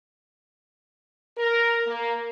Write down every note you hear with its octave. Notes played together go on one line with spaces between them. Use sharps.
A#4
A#3